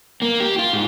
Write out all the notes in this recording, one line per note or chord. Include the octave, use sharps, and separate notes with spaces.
A#3
G4
F4
G#2